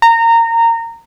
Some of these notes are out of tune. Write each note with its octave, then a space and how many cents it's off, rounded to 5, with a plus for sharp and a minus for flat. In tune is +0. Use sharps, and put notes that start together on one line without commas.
A#5 -20